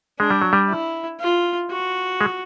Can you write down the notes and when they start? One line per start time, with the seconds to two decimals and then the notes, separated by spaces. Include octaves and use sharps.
0.20 G#3 D4
0.30 G3
0.42 F#3
0.53 G3
0.70 E4
1.20 F4
1.70 F#4
2.21 G#3